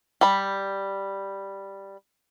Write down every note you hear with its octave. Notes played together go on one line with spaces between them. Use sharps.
G3 B5